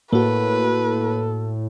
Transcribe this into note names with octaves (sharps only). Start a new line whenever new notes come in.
A2 A#3 F#4 A4 B4